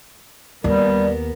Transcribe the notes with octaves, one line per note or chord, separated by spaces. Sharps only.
D#2 G3 B3 A#4 D5